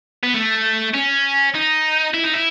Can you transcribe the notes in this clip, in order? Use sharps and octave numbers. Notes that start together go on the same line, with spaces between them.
B3
A3
C#4
D#4
E4
D#4
E4